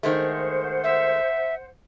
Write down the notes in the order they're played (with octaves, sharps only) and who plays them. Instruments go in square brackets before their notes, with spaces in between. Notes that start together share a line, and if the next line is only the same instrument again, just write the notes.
[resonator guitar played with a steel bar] D#3 G#3 A3 [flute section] C5 F#5
[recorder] E5